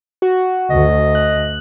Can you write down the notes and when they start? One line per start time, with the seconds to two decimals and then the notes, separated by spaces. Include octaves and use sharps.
0.22 F#4
0.70 D2 D#5
1.15 F#6